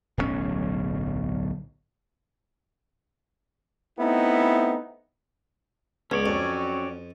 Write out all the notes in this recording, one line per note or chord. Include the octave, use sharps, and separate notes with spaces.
D1 B1 B2 C#4
A3 B3 C4 D#4 E4
C#2 B3 C#4 C#5 D5
F2 F#3 C4 F#4